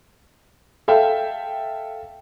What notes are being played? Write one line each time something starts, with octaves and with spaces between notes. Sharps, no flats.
A4 E5 F5 G5